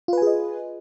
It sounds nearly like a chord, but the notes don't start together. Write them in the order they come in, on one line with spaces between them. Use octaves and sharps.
F4 B4 G#5 G#4 D#5